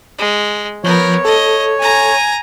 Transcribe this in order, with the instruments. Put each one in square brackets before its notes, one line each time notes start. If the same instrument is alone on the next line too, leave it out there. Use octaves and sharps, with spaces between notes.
[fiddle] G#3
[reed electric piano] F3 G6 [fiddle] B3 A#4 [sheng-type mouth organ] C#5
[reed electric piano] A4 [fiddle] D#5
[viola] G#5 [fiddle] A#5